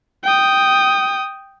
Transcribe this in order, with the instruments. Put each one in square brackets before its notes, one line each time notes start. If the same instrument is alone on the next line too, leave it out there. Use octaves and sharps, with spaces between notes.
[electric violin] G5 D#6